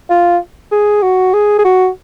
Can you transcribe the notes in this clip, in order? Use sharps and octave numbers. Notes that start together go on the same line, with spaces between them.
F4
G#4
F#4
G#4
G#4
F#4